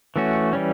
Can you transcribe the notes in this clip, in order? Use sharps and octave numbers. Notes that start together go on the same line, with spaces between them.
E3 A3 C#4 F#4
E3 G3 C#4